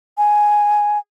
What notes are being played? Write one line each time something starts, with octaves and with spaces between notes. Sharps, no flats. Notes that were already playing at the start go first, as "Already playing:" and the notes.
G#5